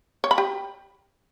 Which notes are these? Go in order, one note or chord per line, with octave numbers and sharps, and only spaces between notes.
C#5
B5
G4